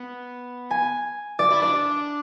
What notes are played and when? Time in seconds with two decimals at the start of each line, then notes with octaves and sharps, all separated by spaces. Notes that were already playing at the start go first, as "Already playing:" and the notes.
Already playing: B3
0.71 G#5
1.39 D5
1.51 E4
1.61 D4 D5